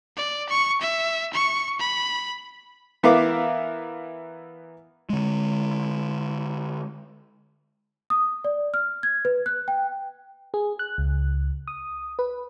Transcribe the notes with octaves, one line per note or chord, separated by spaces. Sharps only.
D5
C#6
E5
C#6
B5
E3 B3 A#4 E5 F5 D6
D3 G#3
D#6
D5
F6
G#6
B4
F#6
G5
G#4
F#6
C#2
D#6
B4